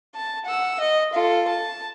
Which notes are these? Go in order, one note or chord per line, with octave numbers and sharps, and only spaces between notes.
A5
F#5 E6
D#5
F4 A4
A5